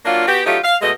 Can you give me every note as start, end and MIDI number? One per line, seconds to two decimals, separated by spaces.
0.05 0.24 54
0.05 0.24 58
0.05 0.24 62
0.05 0.24 65
0.28 0.40 59
0.28 0.40 66
0.28 0.40 67
0.46 0.58 54
0.46 0.58 57
0.46 0.58 63
0.46 0.58 65
0.46 0.58 67
0.64 0.75 77
0.82 0.91 47
0.82 0.91 56
0.82 0.91 57
0.82 0.91 75